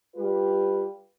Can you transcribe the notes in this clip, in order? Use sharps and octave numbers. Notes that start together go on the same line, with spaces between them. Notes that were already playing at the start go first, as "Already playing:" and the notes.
G3 F4 G4 B4